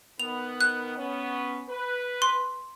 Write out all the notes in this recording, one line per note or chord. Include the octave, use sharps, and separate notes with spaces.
D#3 B3 F7
F#6
B3 C#4
B4
C6